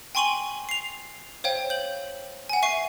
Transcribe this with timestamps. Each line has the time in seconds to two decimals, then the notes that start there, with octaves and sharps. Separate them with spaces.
0.15 G5 G#5 C6 C#6 D#7 F#7
0.69 C7 F7
1.44 C5 C#5 F5 G5
1.70 G6 F#7
2.50 F#5 G#5
2.62 E5 C#6 C7 D#7